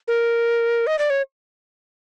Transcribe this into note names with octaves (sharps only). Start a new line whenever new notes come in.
A#4
D#5
D5
C#5